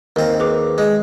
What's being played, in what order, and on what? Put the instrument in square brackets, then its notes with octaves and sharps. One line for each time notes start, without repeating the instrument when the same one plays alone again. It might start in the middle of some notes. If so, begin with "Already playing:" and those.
[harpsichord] D#2 C4 [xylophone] A#4
[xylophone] G#4 B4 D6
[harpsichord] G#3